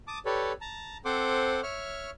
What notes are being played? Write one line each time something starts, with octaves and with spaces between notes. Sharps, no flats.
A5 D6 D#6
G4 A4 B4 C#5 D5
A5 A#5
C4 A4 C5 F#5 C6 D6
C#5 E5 C#6 F6